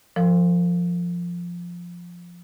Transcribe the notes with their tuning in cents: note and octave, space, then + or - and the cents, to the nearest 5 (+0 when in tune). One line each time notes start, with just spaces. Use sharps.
F3 +0 A4 +45